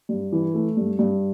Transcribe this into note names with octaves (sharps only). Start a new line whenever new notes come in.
G2
E3
A3
G2
G2